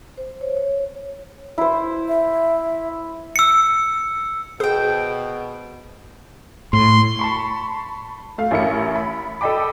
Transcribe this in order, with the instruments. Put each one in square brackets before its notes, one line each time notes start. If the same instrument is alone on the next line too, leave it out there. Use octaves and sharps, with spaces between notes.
[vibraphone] C5
C#5
C#5
[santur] E4 C5
[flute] E5
[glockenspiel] E6 C#7
[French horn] B2 [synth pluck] G#4 [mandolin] C5 G5
[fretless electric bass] A2 [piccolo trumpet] C6
[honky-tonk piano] A5 B5 C#6
A3 F5
A1 C#4 E4 A#4 C#7
B5
A4 D5 D#5 G5 B5 D6